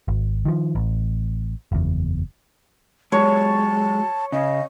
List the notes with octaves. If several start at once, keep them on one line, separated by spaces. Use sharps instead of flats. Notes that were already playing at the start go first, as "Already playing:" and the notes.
G#1
D#3 F3
A1
F#1 E2
F#3 G#3 C#5 A5
C#3 D#5